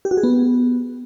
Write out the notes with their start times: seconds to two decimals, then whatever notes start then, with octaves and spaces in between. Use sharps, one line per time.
0.05 G4
0.11 F#4
0.17 G#4
0.23 B3